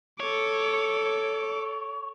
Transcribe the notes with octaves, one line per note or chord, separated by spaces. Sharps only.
A4 C#5 D6